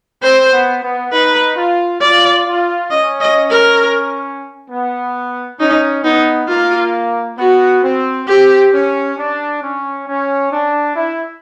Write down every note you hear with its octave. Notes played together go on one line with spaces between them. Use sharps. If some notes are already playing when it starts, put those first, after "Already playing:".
C4 C5
B3
B3
D#4 B4
F4
F4 D5
F4
C#4 D#5
D#5
A#4
B3
C#4 D#4
B3 D#4
A#3 F4
B3 F#4
C4
C4 G4
C#4
D4
C#4
C#4
D4
E4